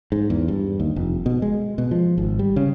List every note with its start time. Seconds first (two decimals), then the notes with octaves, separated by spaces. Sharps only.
0.12 G#2
0.30 E2
0.48 G2
0.80 D#2
0.96 F1
1.26 B2
1.42 G#3
1.78 B2
1.91 F3
2.18 G#1
2.39 G3
2.56 C#3